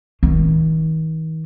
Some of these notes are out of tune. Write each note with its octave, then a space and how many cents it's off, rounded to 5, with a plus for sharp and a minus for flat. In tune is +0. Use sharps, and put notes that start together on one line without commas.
D#3 +45